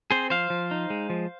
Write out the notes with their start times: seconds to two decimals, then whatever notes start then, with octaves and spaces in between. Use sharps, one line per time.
0.11 C4 G#4 C5
0.30 F3 C5 F5
0.50 F3
0.71 D#4
0.90 G#3
1.10 F3